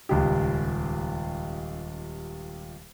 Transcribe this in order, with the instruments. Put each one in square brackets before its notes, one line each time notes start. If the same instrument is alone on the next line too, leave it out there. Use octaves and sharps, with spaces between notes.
[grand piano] D#1 C#2 G4